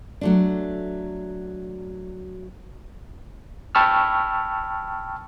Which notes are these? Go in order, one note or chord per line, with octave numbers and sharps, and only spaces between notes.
F#3 A3 D4
G5 A5 B5 C#6 E6 F6